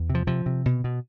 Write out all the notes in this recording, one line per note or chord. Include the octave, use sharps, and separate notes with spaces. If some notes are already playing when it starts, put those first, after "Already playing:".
Already playing: E2
C3
F3
C3 F3
C3
B2
B2